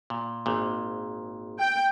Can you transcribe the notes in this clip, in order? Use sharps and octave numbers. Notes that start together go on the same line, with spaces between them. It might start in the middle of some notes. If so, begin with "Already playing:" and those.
A#2
G#1 A#2
G5